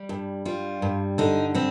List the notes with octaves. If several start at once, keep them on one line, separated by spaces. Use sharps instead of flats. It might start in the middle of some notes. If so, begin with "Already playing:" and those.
Already playing: G3
G2
G3 F4
G2
D3 D#4
G3 C4